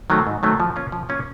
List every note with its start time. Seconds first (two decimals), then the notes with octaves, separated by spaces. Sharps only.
0.10 D#3 F#3 A3 C4
0.27 G#2
0.43 D#3 F#3 A3 C4
0.60 F3
0.76 A#3 C#4 F4
0.92 F3
1.09 A#3 C#4 F4